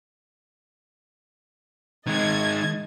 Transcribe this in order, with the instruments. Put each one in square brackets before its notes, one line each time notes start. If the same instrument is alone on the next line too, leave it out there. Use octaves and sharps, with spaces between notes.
[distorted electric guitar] D#3 G#3 [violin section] D#5 G#6 A6